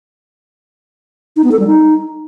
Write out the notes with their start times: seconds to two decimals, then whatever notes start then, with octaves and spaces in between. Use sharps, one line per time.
1.36 D#4
1.44 B3
1.52 A4
1.59 G3
1.67 D#4